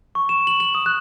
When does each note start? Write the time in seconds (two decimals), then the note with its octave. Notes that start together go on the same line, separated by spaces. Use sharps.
0.15 C#6
0.29 E7
0.47 F#7
0.60 F#7
0.75 D#6
0.86 F#6